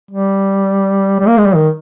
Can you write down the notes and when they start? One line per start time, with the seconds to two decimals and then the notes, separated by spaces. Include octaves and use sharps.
0.11 G3
1.20 G3
1.28 A#3
1.38 G#3
1.46 G3
1.55 D#3